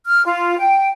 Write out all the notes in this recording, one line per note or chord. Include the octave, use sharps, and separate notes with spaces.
F6
F4
G5